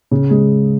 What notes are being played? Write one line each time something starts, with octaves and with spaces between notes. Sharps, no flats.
C#3
G#3